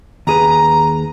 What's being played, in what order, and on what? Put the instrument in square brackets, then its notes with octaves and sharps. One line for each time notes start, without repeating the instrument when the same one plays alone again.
[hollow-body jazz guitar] D#2 G#4 B4 [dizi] A#5